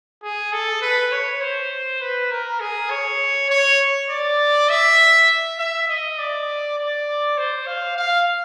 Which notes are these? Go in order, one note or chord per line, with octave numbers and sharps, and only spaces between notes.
G#4
A4
B4
C#5
C5
B4
A#4
G#4
C#5
C#5
D5
E5
E5
D#5
D5
D5
C5
F5
F5